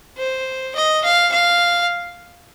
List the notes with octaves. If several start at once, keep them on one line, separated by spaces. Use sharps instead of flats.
C5
D#5
F5
F5